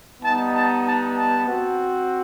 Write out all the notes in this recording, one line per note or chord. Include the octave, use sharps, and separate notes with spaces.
G3 B3 D#4 A5
A5
A5
A5
C4 F#4